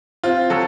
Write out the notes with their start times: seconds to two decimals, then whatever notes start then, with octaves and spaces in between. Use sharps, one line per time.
0.23 C4 F4
0.50 F#3 A4